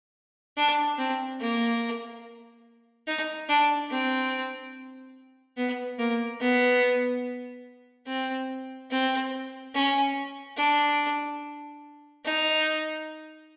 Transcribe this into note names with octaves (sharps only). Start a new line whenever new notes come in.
D4
C4
A#3
D#4
D4
C4
B3
A#3
B3
C4
C4
C#4
D4
D#4